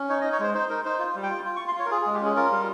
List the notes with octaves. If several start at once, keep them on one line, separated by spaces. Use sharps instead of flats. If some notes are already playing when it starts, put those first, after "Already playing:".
Already playing: C#4
D#4 C#5
D#4 D#5
C#5
G#3 C5
D#4 C5
D#4 A#4
D#4 C5
F4
G3
G5
F4
F4
C#6
F4
C6
F4 C#5
A#4
F4 G#4
G#4
G#3
G4
C#4 G#4
F4 A#4
G3